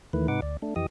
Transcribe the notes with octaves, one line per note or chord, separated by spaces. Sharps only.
D#2 D#3 E3 A3 B4
G#2 C3 D#4 B4 F#5 D6
D2 D5
A3 D4
F2 E3 G4 D#5 D#6